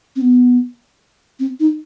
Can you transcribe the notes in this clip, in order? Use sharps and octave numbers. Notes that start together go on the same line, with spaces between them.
C4
B3
C4
D#4